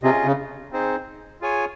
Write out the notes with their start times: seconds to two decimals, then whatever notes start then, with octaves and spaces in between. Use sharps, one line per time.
0.03 C3 C#4 F4 G#4 D#5
0.25 C#3
0.72 C4 D#4 G#4 C5
1.41 F4 G#4 C#5 G#5